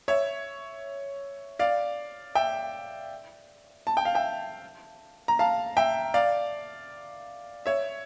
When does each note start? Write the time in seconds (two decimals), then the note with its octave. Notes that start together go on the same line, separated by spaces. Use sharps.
0.08 C#5 E5
1.59 D5 F5
2.35 E5 G5
3.87 A5
3.97 G5
4.05 F5
4.15 E5 G5
5.28 A#5
5.39 F5 A5
5.77 E5 G5
6.14 D5 F5
7.66 C#5 E5